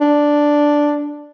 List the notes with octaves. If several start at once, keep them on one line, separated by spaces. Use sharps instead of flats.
D4